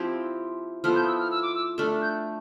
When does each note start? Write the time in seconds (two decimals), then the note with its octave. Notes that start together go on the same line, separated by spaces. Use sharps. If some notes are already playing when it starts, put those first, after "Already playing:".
Already playing: F3 C4 E4 G4
0.84 F3 B3 E4 A4 F6
0.96 G6
1.07 E6
1.19 F6
1.31 E6
1.43 D6
1.55 E6
1.78 A3 D4 A4 F6
2.02 G6